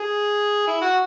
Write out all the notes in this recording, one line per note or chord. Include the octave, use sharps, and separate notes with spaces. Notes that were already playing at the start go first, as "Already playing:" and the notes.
Already playing: G#4
E4
F#4